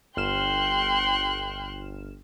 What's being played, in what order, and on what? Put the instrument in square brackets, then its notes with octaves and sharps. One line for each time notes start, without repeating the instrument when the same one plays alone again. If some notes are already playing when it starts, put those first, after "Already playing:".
[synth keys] G1 F6 E7 [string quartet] G5 C6 F#6